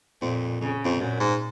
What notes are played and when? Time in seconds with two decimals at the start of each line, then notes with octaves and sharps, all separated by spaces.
0.22 F2 A#2
0.61 F2 C#3
0.85 F2
1.00 F#2 A#2
1.20 G#2